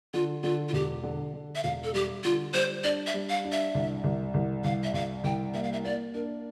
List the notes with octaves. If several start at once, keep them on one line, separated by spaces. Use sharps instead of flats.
D3 F4
D3 F4
F4
E1 G4
D3
D3
E5
E1 F5
A4
G3 G4
D3 F4
G3 C5
D4 D5
E5
G3
F5
D4
E5
C2
C2
C2
C2 F5
E5
C2 F5
C2 G5
A#3 E5
F5
E5
A#3 D5
D4 A#4